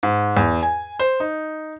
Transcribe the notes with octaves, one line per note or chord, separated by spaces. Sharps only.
G#2
E2
G#5
C5
D#4